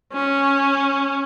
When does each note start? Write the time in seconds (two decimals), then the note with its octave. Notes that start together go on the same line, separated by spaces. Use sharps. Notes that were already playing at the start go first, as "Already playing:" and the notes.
0.13 C#4